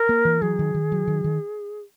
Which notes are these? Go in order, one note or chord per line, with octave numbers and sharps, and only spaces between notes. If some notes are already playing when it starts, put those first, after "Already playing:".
Already playing: A#4
A#3
E3
F#3 G#4
D#3
D#3
F#3
D#3
D#3